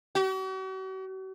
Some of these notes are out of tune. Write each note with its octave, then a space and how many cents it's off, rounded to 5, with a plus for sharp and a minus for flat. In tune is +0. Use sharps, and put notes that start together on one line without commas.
F#4 +45